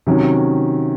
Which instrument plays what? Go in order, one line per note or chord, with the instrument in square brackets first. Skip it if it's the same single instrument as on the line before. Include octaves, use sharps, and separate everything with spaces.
[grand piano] C3 D#3 F#3 C#4